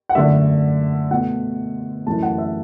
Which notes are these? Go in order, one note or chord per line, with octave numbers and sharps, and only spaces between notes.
F#5
F#2 D3 A3 E5
B2 A3 F#5
F#2 E3 A3 A5
F#5
E5